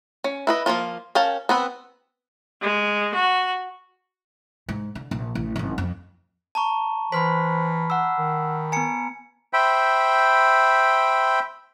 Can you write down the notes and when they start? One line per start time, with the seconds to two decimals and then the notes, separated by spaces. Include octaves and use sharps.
0.24 C#4
0.47 E4 B4 D#5
0.66 F3 F#3 A#3 F4
1.15 C#4 A#4 F5 G5 A5
1.49 B3 C4 B4
2.62 G#3
3.15 F#4
4.69 G#2
4.95 D3
5.11 A#1
5.35 A1
5.56 G#1 F#2
5.78 F2
6.55 A5 A#5 C#6
7.12 E3 C5 B5 C6 F6 B6
7.90 F#5 E6
8.18 D#3
8.72 B3 G#5 A#5 C#7
9.53 C5 E5 G5 B5